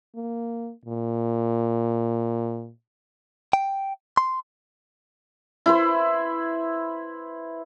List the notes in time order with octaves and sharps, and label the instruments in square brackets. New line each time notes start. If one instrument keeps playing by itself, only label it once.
[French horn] A#3
A#2
[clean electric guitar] G5
C6
[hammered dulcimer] E4 B4 C5